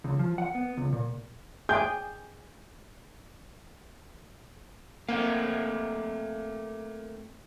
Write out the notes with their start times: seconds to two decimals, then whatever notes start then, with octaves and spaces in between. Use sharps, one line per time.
0.04 C#2
0.19 F3
0.38 F#5
0.55 B3
0.77 C#2
0.93 A#2
1.69 G#4 G5 G6
5.09 A3 A#3 C4 F5